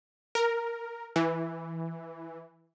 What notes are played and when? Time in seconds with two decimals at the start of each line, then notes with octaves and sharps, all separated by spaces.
0.35 A#4
1.16 E3